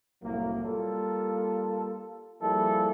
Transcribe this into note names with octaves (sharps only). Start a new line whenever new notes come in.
C2 F#2 A2 F#3 A#3
G3 A#3 F4 A4
F3 G3 A#3 E4 G#4 A4